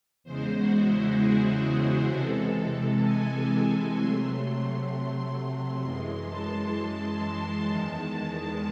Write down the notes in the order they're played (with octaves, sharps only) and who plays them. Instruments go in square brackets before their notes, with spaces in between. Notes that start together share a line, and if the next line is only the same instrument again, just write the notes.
[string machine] E2 C#3 G#3 C5
F#4
E4
G#4
C3 E3 G#3 A4
G#5
C3 F#3 A3 C6
F#2 E3 G#3 C6
A5
C6
A5
C6
E2 D#3 G#3 A5